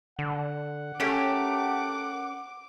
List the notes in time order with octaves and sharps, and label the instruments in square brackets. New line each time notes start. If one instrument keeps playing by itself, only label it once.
[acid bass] D3 [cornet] F#5
[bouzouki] A3 G4 A#4 [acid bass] C#4 [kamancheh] D6